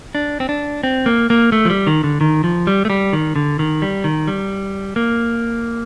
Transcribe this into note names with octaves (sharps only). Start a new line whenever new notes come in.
D4
C4
D4
C4
A#3
A#3
A3
F3
G3
D#3
D3
D#3
F3
G3
A3
G3
D#3
D3
D#3
G3
D#3
G3
A#3